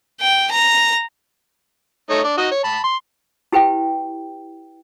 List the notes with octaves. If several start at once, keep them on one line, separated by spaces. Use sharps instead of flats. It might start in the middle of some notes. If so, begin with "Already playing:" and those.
G5
A#5
A3 D#4 C#5
D4
D#4 F#4 D#5
C#5
A5 B5
C6
E4 G4 B4 G5